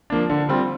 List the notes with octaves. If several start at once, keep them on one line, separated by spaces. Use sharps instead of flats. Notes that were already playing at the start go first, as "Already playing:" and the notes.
F3 A#3 D4
D3
G3 C4 F4